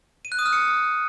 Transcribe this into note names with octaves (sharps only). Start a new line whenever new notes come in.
D#7
F#6
D#6
F6
C#7